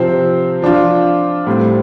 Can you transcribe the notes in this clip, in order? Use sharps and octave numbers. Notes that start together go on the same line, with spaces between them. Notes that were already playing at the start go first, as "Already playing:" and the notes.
Already playing: C3 F3 C4
F3 D4 F4
A2 G3 C4